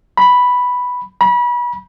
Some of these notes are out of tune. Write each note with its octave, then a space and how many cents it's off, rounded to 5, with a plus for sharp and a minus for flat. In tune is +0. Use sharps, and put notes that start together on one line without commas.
B5 +0
B5 -30